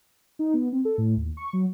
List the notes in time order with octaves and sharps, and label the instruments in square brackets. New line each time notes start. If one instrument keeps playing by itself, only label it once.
[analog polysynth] D#4
B3
C4
A4
A2
D#2
C#6
F#3